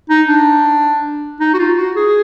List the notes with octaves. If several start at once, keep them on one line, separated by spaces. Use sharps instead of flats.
D#4
D4
D#4
F#4
F4
F#4
G#4